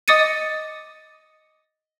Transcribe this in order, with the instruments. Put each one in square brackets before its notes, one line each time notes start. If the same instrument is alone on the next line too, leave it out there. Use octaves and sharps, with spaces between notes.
[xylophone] D#5 D6 D#6 A6 C#7 D#7